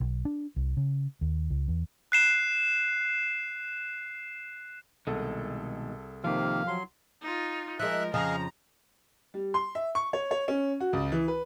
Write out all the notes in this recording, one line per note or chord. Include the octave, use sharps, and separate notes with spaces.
B1
D4
C2
C#3
D#2
C#2
E2
F#6 C7 E7
C2 B2 D#3 G#3 G#4 A4
C3 D#3 F3 A#3 G4 F5
F#3 C6
D#4 F4
F3 G#3 A#4 E5 F#6
F2 C#3 F3 G#4 D#5 F5 A#5
G3
C6
E5
C#6
C#5
C#5
C#4
F#4
C#2
E3
B4